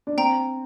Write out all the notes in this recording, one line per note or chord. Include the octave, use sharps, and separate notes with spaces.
D4
C4 G5 A#5